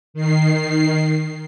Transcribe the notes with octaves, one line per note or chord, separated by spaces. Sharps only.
D#3 C7